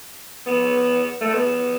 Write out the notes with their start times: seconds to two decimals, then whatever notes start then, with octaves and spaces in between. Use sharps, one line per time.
0.46 B3
1.21 A3
1.33 B3